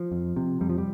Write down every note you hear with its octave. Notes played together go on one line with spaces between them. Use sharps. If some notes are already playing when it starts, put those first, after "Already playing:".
Already playing: F3
F2
C3
F2 G3
F3
G3